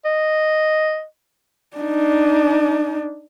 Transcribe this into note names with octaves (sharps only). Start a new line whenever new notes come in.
D#5
D4 D#4